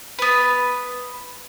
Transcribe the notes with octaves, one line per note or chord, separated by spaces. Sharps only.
B3 B4